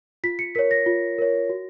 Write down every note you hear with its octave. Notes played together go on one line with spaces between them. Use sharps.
F4 B6
C#7
A#4 C#5 B6
A#6
F4
A#4 C#5
F#4